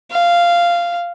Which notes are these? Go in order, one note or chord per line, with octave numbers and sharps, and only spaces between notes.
F5